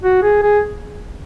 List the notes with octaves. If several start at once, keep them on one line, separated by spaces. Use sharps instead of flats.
F#4
G#4
G#4